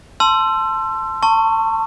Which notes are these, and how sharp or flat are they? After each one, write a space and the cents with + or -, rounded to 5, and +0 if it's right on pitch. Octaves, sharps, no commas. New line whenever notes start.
A5 +0 C6 +0 E6 +30
A5 +30 C#6 -5